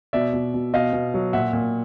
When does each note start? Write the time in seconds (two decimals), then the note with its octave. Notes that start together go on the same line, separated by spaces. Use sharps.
0.13 B2 D5 E5
0.33 B2
0.54 B2
0.74 B2 D#5 F5
0.93 B2
1.14 F#3
1.33 A#2 E5 F#5
1.53 A#2